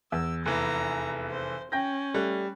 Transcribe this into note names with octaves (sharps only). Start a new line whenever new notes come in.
E2 E6
F1 E3 A#5
C5
C#4 G5 G6 A#6
G3 A3 F#6